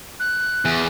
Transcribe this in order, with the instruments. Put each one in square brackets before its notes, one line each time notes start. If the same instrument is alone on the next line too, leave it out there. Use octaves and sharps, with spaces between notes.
[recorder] F#6
[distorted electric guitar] E2